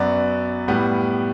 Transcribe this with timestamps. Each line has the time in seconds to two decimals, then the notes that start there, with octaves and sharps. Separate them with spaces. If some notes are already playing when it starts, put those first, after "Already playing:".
Already playing: F#2 F#3 B3 D5
0.68 A2 G3 B3